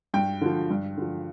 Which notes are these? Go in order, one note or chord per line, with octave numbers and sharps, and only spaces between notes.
G2 G5
D3 F3
G2
D3 F3